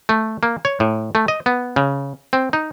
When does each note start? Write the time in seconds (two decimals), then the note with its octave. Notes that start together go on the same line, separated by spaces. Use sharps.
0.09 A3
0.43 A#3
0.65 C#5
0.80 A2
1.15 A3
1.28 D#5
1.46 B3
1.76 C#3
2.33 C4
2.53 D#4